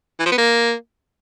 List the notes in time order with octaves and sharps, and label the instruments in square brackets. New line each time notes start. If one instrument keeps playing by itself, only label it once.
[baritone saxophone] E3
F3
B3
A#3